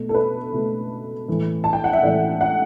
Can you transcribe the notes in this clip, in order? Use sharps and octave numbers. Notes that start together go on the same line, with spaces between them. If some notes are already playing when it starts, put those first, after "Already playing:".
Already playing: B2 A3
A4
B4
B2 A3
A2 E3 A3
A5
G5
F#5
E5
A2 E3 A3 D5
F#5